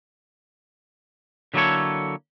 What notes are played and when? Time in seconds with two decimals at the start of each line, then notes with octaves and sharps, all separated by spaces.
1.54 D3 F#3 A#3 E4 A4 C#5